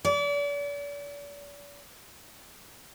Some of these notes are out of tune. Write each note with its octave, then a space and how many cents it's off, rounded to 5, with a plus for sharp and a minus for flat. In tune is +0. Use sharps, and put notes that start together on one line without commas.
D5 -40